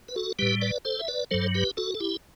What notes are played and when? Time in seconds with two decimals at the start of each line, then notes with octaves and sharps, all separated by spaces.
0.08 B4
0.16 F#4 A4
0.39 A2 G3 G4 B4
0.62 B4 D5
0.85 A4 C5
0.99 E5
1.08 B4 D5
1.31 G2 F#3 A4 C5
1.55 G4 B4
1.77 F#4 A4
1.95 A4
2.00 E4 G4